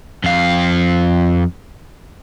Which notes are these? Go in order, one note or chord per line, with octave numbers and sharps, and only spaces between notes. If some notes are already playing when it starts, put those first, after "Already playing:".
F2 F5